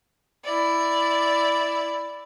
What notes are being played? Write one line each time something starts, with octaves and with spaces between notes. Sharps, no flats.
E4 D5